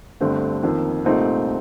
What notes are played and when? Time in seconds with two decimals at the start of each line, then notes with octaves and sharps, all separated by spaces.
0.20 G1 G2 D3 A3 C4
0.63 F2 D#3 A#3
1.04 C2 A#2 A3 C4 D#4